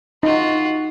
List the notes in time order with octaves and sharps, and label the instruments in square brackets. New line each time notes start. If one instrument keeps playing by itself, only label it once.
[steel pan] D#4 [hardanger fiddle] F4 F#4